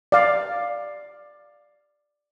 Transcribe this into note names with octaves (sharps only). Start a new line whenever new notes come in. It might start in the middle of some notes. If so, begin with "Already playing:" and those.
D5 F5